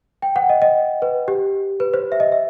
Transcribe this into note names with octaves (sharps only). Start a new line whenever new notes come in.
G5
F#5
D#5
D#5
B4
G4
B4
C5
E5
D#5
E5